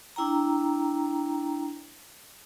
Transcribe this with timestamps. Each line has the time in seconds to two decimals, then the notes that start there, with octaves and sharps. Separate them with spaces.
0.16 D4 E4 G5 A#5